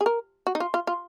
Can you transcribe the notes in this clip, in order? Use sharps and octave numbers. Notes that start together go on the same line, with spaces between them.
G#4
A#4
F#4
D#4
F4
F4
F4